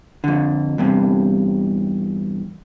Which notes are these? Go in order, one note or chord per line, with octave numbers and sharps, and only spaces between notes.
F2 D3
E2 G2 C3